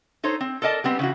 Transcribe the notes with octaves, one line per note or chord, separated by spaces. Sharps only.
D#4 A4 C5 C#5
C4
A4 A#4 D5 D#5 A5
G3 B3 C4
C#3 E3 F#4